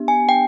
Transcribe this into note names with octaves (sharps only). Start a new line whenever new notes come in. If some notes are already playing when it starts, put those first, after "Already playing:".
Already playing: B3 D4 G4
G#5
G5